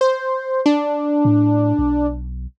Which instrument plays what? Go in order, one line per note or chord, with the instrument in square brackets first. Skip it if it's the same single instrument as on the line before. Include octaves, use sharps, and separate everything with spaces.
[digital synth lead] C5
D4
[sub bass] A2
B1